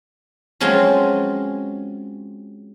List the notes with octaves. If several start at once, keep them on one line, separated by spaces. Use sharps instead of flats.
F3 F#3 G#3 C4 C#4 F4